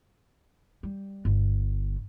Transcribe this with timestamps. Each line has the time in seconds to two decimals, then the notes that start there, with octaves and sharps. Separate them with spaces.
0.83 G3
1.25 G1